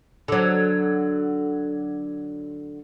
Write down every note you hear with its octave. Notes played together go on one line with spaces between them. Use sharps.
D3 F#3